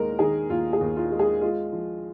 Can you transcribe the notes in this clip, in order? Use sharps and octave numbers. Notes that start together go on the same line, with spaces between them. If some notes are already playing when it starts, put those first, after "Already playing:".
Already playing: D#2 G#3 A#4
D#3 G#4
D#2 F4
G#4
D#2
F4
G#3
G#4
G#3 F4
F3